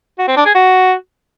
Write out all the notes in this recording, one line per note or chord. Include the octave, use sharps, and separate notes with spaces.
F#4
C4
D4
G#4
F#4